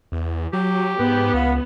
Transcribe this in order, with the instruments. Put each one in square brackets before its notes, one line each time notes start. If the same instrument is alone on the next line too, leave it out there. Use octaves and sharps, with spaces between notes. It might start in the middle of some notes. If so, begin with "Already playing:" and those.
[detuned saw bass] E2
[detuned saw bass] F#3 [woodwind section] G4
[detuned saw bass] G#2 [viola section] B3
[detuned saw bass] C#2 [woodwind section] F5 F#5 B5